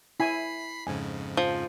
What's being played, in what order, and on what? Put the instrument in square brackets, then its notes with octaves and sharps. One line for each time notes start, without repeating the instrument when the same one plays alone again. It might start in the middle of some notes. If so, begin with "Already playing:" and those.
[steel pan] E4 G#5 [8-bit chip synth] B5 B6 C7
[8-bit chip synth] F2 G#2 C#3 [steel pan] G#5
[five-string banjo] F3